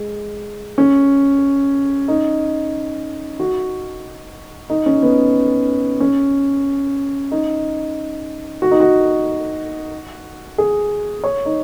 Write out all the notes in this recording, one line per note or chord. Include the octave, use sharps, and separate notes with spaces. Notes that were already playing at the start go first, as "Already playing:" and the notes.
Already playing: G#3
C#4
D#4
F#4
D#4
C#4
B3
C#4
D#4
F#4
D#4
F#4
G#4
C#5
D#4